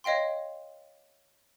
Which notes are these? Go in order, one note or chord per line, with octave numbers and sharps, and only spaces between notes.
C#5 D#5 F5 G5 C6